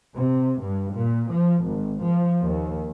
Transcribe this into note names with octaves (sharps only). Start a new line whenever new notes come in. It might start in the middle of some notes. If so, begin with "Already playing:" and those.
C3
G2
A#2
F3
G#1
F3
D#2